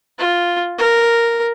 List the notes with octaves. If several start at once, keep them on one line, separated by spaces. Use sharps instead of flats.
F4
A#4